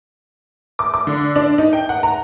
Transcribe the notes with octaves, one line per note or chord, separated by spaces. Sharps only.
D6
D6
D3
D4
D#4
G5
F#5
A#5